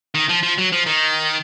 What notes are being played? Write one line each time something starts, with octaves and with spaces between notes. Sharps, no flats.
D#3
F3
F3
F#3
F3
D#3